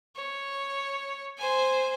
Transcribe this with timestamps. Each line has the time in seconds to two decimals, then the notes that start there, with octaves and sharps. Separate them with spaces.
0.16 C#5
1.38 C5 G#5